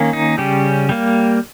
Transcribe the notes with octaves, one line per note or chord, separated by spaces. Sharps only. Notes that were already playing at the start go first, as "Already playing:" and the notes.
Already playing: D#3 A#3 C#4
D#4
C#3 G3 C#4 G4
G3 A#3